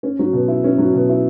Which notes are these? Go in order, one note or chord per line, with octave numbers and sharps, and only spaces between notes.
C#4
F#3
B2
E4
C#4
F#3
B2
E4